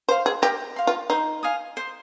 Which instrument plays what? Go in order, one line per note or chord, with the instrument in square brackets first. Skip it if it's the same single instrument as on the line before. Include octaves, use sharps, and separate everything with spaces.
[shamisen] C5 [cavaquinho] F5 C6
[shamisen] G#4
[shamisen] G4 [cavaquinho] A#4
[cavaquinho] F5 C6
[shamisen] F4
[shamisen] D#4 [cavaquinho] C5
[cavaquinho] F5 G#5 D#6
C5